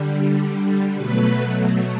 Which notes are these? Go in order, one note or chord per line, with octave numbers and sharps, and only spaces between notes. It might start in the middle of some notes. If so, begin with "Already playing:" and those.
Already playing: D3 G3
B2 F#3 A3 B4